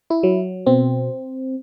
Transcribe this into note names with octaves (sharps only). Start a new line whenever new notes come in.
E4
F#3
B2 C4